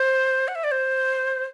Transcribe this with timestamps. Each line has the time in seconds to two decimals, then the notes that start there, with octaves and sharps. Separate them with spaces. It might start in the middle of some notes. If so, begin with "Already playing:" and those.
Already playing: C5
0.48 F#5
0.55 E5
0.64 D5
0.71 C5